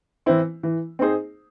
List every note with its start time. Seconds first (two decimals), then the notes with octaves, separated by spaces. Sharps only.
0.26 E3 C4 E4 C5
0.63 E3
0.99 C4 D#4 G#4 C5